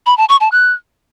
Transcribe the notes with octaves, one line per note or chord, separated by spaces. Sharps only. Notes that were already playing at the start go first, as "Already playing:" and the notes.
B5
A5
C#6
A5
F#6